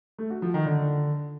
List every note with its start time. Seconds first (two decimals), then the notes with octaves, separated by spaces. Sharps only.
0.19 A3
0.30 F#4
0.42 F3
0.54 D#3
0.66 D3